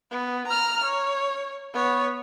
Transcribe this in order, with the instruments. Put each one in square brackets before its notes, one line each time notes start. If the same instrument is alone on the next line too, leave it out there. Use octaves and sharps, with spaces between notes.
[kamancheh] B3
A#5 F6
C#5
B3 C#5